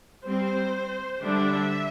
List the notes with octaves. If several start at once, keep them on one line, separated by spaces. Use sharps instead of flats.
G3 C4 C5
D3 G3 D4 E5